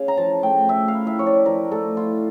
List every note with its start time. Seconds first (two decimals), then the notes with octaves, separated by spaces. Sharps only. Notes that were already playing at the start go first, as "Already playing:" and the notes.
Already playing: C#3 F5
0.08 A#5
0.17 F3 A5
0.43 A3 G5
0.68 A3 E5
0.88 F5
0.94 E4
1.07 E5
1.19 F3 C#5
1.27 D5
1.46 F3 A#4
1.72 A3 A4
1.97 E4 F4